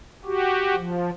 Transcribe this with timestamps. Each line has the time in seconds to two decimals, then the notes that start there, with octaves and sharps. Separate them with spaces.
0.25 F#4 G4
0.76 F3